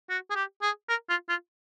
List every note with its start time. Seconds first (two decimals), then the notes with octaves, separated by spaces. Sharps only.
0.10 F#4
0.30 G#4
0.36 G4
0.62 G#4
0.89 A#4
1.10 F4
1.29 F4